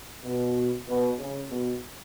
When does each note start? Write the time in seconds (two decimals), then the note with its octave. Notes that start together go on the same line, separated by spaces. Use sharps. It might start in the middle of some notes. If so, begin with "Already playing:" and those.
0.24 B2
0.87 B2
1.19 C#3
1.50 B2